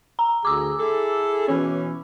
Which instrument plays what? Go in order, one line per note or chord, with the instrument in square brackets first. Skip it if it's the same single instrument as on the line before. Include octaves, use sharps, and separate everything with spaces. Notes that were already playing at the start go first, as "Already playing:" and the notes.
[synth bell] A#5
[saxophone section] D2 G#4 [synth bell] D6 E6
[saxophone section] E4 G#4 A4
B2 E3 C#4